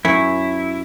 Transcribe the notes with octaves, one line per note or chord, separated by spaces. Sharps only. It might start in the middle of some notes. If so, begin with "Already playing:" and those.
F#2 E4 C#5